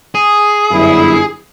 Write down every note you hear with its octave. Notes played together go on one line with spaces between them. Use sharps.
G#4
G1 F#2 E4